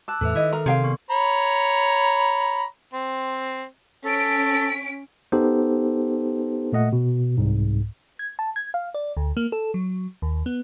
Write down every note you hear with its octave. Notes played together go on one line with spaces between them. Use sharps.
A5 D6 E6 F#6
E2 A2 A4 B4 E5
D#3 E4 D#5
A4 A#4 A#5 F6
C3 G#4 D5 F5 G5 C6
B3 C#6
C#5 A#5 B5
C4
C#4 A4 B6 D7
B3 D#4 G4 A4 C5
A#2 A3 D#5 F#5
B2
C2 G#2
G#6
A5
G#6
F5
D5
D2
A#3
A4
F#3
D#2
B3